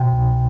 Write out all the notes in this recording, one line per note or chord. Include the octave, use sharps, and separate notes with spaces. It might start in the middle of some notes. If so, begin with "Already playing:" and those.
Already playing: B2 G5
C2